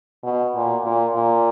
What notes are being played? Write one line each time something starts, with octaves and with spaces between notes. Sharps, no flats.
B2
A#2
A#2
A#2